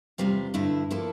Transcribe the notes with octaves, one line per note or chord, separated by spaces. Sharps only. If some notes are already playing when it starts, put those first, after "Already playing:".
E2 C3 G3 C4 F4
G2 D3 A3 E4
F3 A#3 E4 A4